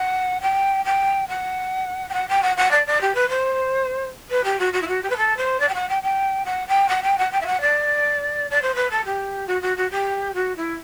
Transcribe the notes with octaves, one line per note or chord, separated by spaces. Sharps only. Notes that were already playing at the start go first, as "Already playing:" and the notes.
Already playing: F#5
G5
G5
F#5
G5
F#5
G5
F#5
F#5
D5
D5
G4
B4
C5
B4
G4
F#4
F#4
E4
F#4
G4
B4
A4
C5
D5
G5
F#5
G5
G5
F#5
G5
F#5
G5
F#5
G5
E5
F#5
D5
D5
C5
B4
A4
G4
F#4
F#4
F#4
G4
F#4
E4